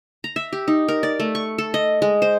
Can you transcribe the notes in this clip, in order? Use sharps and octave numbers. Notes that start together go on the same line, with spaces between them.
A#5
E5
G4
D#4
A#4
D5
A3
C#6
A4
D#5
G#3
C5